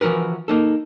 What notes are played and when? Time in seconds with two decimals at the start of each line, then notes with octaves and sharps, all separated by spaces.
0.01 E3 F3 F#4 A#4 B4
0.48 A#3 D#4 A4